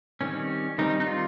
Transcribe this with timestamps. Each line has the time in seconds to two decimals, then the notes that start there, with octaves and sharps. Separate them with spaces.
0.21 D#3 G3 C4 C#4
0.78 D#3 G3 C4 D#4
1.00 D#4
1.07 F4